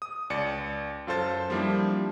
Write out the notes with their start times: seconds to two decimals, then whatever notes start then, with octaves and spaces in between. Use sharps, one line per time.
0.02 D#6
0.30 C#2 D5 C#7
1.07 F#2 F4 A4 C5 A6
1.50 F3 G3 A#3 D4 E4